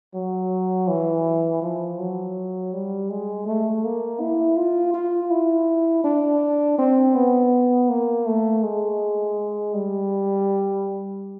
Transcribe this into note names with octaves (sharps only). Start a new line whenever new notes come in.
F#3
E3
F3
F#3
G3
G#3
A3
A#3
E4
F4
F4
E4
D4
C4
B3
A#3
A3
G#3
G3